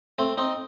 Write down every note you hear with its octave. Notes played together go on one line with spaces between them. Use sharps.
A3 C4
C4 D#4